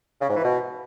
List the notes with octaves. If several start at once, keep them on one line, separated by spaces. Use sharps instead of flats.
C#3
G#2
E3
B2